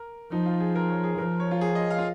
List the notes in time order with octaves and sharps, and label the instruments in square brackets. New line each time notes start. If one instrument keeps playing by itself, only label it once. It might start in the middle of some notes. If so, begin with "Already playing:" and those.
Already playing: [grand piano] A#4
[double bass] F3 [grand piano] D#4
[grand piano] F4
G#4
A#4
C#5
G#4
[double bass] F3 [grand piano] A#4
[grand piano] C#5
F4
G#4
D#5
F5
F4